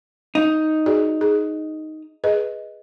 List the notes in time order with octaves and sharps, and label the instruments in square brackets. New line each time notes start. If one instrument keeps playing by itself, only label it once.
[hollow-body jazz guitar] D#4
[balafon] F#4 G#4 D5
G#4
G#4 B4 D#5